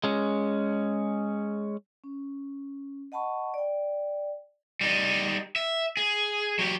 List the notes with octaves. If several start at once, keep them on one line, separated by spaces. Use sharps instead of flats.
G#3 C#4
C#4
D#5 F#5 A5 B5 C#6
D5 G5
G3 D#4
E5
G#4
F#3 G4